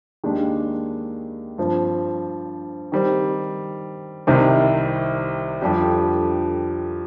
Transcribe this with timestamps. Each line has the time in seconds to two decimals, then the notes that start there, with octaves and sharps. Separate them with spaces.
0.24 D#2 D#3 G#3 D4 G4
1.58 G2 F3 C4
2.92 D#3 G3 C4
4.27 C2 C3 D#3 G3 C4
5.61 F2 D3 G3 D4 G4